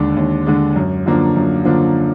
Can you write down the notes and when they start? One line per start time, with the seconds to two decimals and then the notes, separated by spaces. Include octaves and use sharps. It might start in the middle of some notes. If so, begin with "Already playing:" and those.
Already playing: D#2 D3 G#3 D4
0.17 D#2
0.46 D3 G#3 D4
0.76 F#2
1.06 D3 F3 A#3 D4
1.36 F#2
1.65 D3 F3 A#3 D4